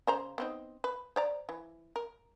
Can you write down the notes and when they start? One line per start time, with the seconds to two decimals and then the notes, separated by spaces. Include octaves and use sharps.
0.07 C#3 C5 A#5
0.38 B3 C4 D#4
0.84 B4
1.16 C5 D5 A#5
1.49 E3
1.96 A#4